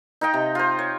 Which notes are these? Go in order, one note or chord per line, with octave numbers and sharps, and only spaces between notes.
D#4 D#5 F5 G5
C3
F4 C5
C#5